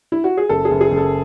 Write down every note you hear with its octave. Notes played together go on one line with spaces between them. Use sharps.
E4
F#4
G#4
F#1 A4
G#4
F#1
G#4
F#1
A4